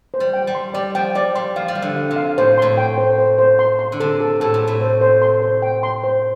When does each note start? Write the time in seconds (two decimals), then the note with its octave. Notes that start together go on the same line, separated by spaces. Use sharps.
0.14 C5
0.20 G3
0.33 G5
0.47 G3
0.55 C6
0.74 G3 D5
0.95 F3 G5
1.15 G3 D5
1.35 G3 C6
1.56 F3 F5
1.68 G3
1.75 F3 F5
1.82 D3
1.96 F5
2.11 C3
2.16 F5
2.38 A2 C5
2.58 A2 C6
2.78 G5
2.98 C5
3.18 C5
3.39 C5
3.59 C6
3.79 C6
3.92 D3
4.00 C3 A4
4.20 A4
4.40 A2 A4
4.54 C3
4.61 A4
4.67 A2
4.81 C5
5.01 C5
5.22 C6
5.42 C5
5.62 G5
5.83 C6
6.04 C5